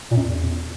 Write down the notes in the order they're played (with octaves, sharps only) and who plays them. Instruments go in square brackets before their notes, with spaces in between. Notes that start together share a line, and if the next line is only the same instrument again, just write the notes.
[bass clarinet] A#2
F#2
E2